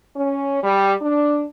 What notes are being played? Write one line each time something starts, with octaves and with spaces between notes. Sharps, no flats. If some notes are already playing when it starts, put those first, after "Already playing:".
C#4
G3
D4